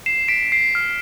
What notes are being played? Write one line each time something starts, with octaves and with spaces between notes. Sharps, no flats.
C7 E7
B6 D7
C7
F6